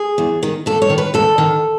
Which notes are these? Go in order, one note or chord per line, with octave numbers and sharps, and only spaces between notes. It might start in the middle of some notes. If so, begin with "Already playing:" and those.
Already playing: G#4
E2
D#3
D#2 A4
C#5
D#3
B4
D#2 A4
D#3